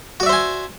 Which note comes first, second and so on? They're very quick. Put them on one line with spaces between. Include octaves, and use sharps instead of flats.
F#4 D5 E5 C5 G#5